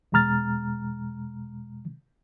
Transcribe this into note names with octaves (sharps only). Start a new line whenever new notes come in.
E2 B2 G#3 A#5 F6 A6